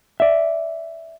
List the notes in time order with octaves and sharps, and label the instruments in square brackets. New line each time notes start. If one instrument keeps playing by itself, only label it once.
[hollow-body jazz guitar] D5 E5